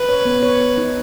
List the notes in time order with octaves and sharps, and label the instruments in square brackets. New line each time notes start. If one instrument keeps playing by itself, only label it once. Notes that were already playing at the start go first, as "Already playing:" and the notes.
Already playing: [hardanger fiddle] B4
[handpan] C#5
B3
C#5
C#5
D#4